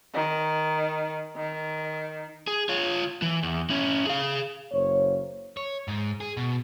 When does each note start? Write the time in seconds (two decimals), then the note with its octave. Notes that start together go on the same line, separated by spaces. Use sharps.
0.14 D#3
1.36 D#3
2.47 G#4
2.69 F4 C#5
3.22 E3
3.43 E2
3.70 C#4 E4
4.07 G#4 F5
4.72 F#1 A#3 C5 C#5
5.57 C#5
5.88 G#2
6.21 G#4
6.37 B2